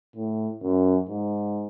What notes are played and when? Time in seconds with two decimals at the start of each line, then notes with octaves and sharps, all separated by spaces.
0.16 A2
0.63 F#2
1.09 G#2